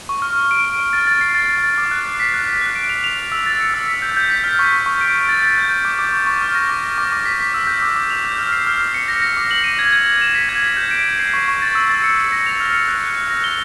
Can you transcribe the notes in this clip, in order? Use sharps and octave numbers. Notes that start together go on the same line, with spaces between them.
C#6
F6
F6
D7
D7
D7
A6
A6
C7
A6
A6
A6
D6
F#6
C7
B6
F#6
F#6
F#6
D7
F7
F7
F7
E6
A6
C#7
E6
B6
G6
G6
B6
F6
C#6
C#6
C#6
D7
D7
A6
A6
G6
G6
D6
D6
C#6
C#6
F6
A#6
D6
A#6
D6
D6
B6
B6
E6
G6
D6
D6
F7
G6
F6
C7
F6
C7
C#7
A#6
A#6
D6
F#7
D#7
G#6
G#6
G#6
E7
B6
G#6
B6
G6
D7
D7
C7
C#6
C#6
A6
E6
A6
C#7
C#7
A#6
F7
F6
C#7
F#6
F#6
F#6
A#6
G7